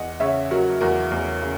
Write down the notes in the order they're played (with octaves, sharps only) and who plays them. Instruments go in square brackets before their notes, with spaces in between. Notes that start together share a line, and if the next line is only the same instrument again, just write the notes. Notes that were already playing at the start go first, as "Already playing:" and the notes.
Already playing: [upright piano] E2 D#5 F#5
C#3 C#5 E5
F#3 F#4 A#4
E2 F#4 A#4
E2
C#3